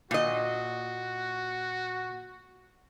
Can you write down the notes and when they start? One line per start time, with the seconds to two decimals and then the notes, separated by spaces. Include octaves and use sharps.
0.11 A#2 F#4 D#5